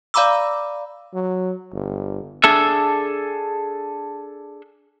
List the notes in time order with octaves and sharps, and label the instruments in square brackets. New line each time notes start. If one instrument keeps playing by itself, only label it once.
[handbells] D5 F5 A#5 B5 D6 E6
[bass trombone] F#3
G1
[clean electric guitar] D4 G#4 A4 E5